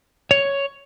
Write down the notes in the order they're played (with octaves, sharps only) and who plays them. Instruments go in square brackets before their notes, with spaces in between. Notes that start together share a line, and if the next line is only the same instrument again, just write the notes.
[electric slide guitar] C#5